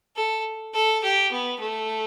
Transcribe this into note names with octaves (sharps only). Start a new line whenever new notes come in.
A4
A4
G4
B3
A3